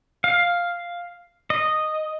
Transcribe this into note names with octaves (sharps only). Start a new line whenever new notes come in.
F5
D#5